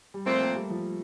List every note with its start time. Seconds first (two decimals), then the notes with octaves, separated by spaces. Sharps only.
0.14 G3
0.26 A#2 F3 A3 C4
0.40 A#3
0.55 G3
0.70 F3